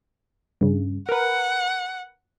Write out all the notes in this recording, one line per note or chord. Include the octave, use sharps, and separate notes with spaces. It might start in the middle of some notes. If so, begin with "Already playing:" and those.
G2 C#3
A#4 B4 F#5